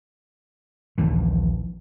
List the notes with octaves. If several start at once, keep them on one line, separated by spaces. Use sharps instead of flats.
A#1 D#2 E3